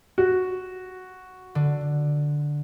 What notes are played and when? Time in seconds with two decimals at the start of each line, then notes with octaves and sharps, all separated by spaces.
0.18 F#4
1.55 D3